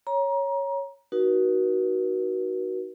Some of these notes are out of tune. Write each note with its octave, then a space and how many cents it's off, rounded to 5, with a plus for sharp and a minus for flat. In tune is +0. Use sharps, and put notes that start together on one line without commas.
C#5 +0 A#5 +25
D#4 +0 F#4 +15 A#4 +45